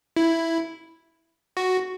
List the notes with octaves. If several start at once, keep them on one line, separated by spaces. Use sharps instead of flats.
E4
F#4